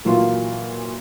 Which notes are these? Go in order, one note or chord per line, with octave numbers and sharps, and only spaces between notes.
A#2 E3 F#3 A#3 F4